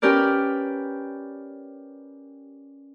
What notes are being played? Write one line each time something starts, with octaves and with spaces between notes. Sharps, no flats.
C#4 G4 A#4 B4 D5